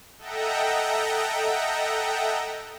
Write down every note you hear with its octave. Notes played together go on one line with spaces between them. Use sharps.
A4 D#5 E5 F#5 G5 A#5